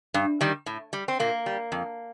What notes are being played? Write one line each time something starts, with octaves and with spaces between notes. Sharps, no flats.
G2
D#3 G3
A2
G3
C4
A#2 A#3
G3
F2